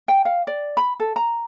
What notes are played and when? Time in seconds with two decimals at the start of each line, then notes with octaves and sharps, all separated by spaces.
0.08 G5
0.25 F5
0.47 D5
0.77 B5
1.00 A4
1.16 A#5